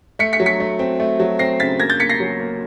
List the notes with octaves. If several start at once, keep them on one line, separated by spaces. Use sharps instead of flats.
A3 B6 C#7
B6 C#7
F#3
B6 C#7
A3
C4
A3
F#3
C4 A#6 C7
C#3 A6 B6
A#3 G#6 A#6
G6 A6
A#3 B6 C#7
A#6 C7
F#3
A#3